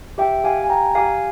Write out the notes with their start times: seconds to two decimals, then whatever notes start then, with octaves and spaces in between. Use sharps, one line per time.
0.18 G4 E5 G5
0.44 G4 F5 G#5
0.64 G#5
0.69 G4 G5 A#5
0.95 G4 F5 G#5